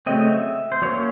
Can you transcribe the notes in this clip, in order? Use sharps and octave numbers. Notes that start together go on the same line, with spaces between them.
C#3 F#3 A3 C4 D#5
E5
C5
F#3 A#3 C#4 C#5